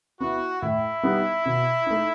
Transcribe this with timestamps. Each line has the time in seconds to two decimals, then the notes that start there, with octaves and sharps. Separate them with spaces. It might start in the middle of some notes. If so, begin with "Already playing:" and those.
0.20 B3 E4 F#4
0.62 A2 E4
1.03 G3 B3 D#4
1.46 B2
1.87 A3 D#4